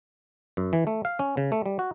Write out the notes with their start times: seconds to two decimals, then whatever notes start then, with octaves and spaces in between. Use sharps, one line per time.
0.57 F#2
0.73 E3
0.87 A3
1.05 F5
1.19 C#4
1.37 C#3
1.52 A3
1.66 G3
1.79 F#4